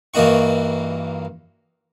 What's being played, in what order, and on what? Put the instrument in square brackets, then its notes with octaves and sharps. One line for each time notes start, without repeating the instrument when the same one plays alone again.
[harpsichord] G2 E3 A#3 D#4 F#4 C#6